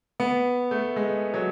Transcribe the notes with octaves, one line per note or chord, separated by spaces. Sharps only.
B3
A3
G#3
F#3